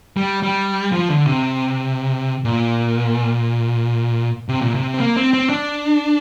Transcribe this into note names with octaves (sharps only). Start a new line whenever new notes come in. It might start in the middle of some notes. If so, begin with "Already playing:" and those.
G3
G3
F3
D3
C3
A#2
C3
A#2
C3
C4
A#3
C4
C4
D4